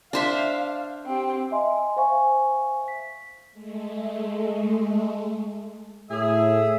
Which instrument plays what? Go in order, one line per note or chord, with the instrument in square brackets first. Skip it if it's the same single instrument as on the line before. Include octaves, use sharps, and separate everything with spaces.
[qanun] D4 C5 E5 [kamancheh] F5
[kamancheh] C4 G4
[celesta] D#5 E5 G#5 C6
C5 E5 F5 G#5 C#6
B6
[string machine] G#3 A3
[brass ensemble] A2 [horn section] G#4 E5